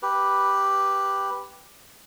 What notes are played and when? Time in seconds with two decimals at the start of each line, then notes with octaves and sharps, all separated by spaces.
0.03 G4 B4